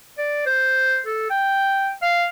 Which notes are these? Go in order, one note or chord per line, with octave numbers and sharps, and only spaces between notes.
D5
C5
A4
G5
F5